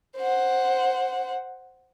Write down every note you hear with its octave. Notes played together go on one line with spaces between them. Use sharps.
C5 F#5